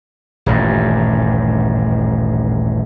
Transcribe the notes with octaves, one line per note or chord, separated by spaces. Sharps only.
D#1 A1 G2